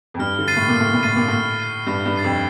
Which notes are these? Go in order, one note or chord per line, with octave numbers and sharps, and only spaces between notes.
F2
G2 F6
D3
A6 C7 D#7
A2
A#2
A2 F6
A#2
A2 A6 C7 D#7
A#2
A2 F6
A6 C7 D#7
G2 F6
G2
A6 C7 D#7
F2